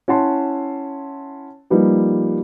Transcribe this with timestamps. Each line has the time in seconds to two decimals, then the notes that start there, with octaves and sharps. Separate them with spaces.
0.08 C#4 E4 F#5 A5 C6
1.70 F3 G3 A#3 D#4 B4